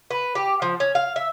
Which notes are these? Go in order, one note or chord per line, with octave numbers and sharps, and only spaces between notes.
B4
G4
F3
C#4
F5
E5